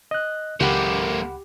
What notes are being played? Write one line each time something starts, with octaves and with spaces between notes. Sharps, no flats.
D#5 F#6
C#2 G#3 A#3 G4 F#5 B5